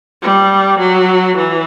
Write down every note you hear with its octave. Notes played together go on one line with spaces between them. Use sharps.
G3
F#3
E3